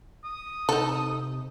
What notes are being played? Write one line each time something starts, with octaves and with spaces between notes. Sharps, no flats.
D#6
C3 D#4 A4